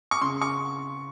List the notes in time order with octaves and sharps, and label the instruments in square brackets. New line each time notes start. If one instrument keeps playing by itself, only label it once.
[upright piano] C#6
C#3 C6
C#6